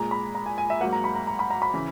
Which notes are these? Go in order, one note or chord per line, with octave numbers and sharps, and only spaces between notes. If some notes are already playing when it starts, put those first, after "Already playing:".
Already playing: A#2 G#3 A#5
B5
A#5
G#5
G#5
E5
G#2 F#3 A#3 F#5
A#5
B5
A#5
A#5
B5
A#5
B5
C#3 E3